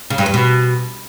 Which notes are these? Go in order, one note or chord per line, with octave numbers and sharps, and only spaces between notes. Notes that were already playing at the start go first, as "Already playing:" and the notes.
C#3
G2
E2
B2